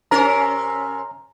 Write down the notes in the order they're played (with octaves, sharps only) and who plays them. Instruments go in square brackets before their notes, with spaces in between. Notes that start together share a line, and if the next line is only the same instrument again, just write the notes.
[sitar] C3 C#4 A#4 [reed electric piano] A#5